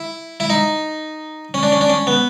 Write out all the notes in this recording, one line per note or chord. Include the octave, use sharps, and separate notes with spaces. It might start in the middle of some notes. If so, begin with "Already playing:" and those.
Already playing: E4
E4
D#4
C#4
D4
C#4
D4
C#4
B3